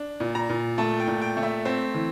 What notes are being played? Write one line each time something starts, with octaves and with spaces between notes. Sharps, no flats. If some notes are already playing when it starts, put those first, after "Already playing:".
Already playing: D4
A#2
A#5
A#2
A3 A5
G5
A#2
G5
A3
E5
C4
E3